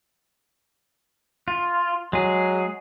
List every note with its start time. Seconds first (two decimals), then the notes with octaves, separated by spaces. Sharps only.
1.48 F4
2.13 F#3 G#3 G#4